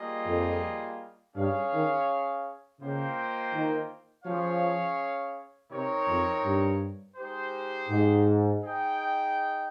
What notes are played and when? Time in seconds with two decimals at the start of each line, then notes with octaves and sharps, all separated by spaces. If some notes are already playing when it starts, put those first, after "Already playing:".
Already playing: G3 A#3 F4 G#4 D#5
0.25 F2
1.35 G2 C#4 G#4 C#5 F5
1.71 D#3
2.79 C#3 A#3 F4 C5 D#5 G5
3.53 D#3
4.25 F3 C#4 G#4 C#5 F5
5.70 C3 C4 D#4 A#4 C#5
6.07 F2
6.43 G2
7.16 G#3 D#4 G4 C5
7.89 G#2
8.62 D#4 G#4 D#5 G5